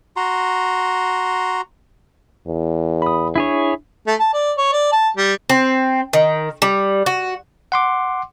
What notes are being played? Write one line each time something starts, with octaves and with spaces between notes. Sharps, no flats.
F#4 A#5 C6
E2
B5 D#6
D4 E4 G#4 C#5
A3
A5
D5
C#5
D5
A5
G3
C4
D#3
G3
F#4
F#5 C6 D6